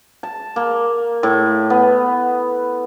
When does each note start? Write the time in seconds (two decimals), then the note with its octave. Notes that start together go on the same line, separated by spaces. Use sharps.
0.23 A5
0.56 A#3
1.23 A2
1.70 B3